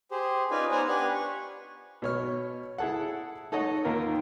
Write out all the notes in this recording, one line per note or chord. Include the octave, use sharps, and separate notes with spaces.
G4 G#4 C5
C#4 D#4 F4 B4 D5 G#5
B3 C5 D5 F#5 G#5 A#5
D4 G4 B4 F#5 G#5
C#6
B2 C#5 F6
E4 G#4 A4 F#5
D#4 A4 C#5 D#5 F#5
D#2 D#3 A#3 F4 A#4